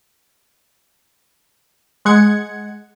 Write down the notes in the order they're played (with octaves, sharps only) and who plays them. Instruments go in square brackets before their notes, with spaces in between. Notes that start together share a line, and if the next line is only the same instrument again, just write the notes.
[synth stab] G#3 F#5 G#6 C#7